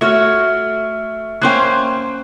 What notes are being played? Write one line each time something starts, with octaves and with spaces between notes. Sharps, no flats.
A3 F#4 C#5 E5 C#6 F6
A#3 C#4 C5 G5 C6 F#6